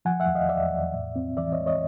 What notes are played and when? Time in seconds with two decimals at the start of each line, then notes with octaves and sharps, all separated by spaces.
0.05 F3 F#5 G#5
0.20 E5 F#5
0.27 E2
0.35 D#5 F5
0.49 E2 D5 E5
0.71 E2
0.94 A2
1.16 C4
1.37 E3 D5 E5
1.52 C#5 D#5
1.60 G#3
1.66 C#5 D#5